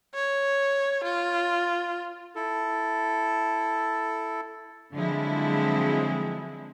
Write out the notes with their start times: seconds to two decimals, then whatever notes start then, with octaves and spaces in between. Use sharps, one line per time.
0.14 C#5
1.04 F4
2.35 E4 A4
4.94 D3 F3 F#3 G#3 C4 E4